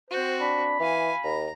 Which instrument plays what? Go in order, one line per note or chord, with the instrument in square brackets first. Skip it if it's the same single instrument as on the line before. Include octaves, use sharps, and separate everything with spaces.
[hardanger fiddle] C4 F#4 [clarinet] C5
[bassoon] D4 [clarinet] B5
[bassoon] E3 [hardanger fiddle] F5 G#5
[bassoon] D#2 [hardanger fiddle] A#5